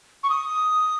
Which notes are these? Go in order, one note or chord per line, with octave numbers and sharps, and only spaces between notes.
C#6
D#6